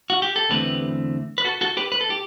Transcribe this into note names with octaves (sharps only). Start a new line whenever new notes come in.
F#4
G4
A4
E2 D3 A3 C4 G4 B4
B4
F#4 A4
F#4 A4
G4 B4
B4
A4
G4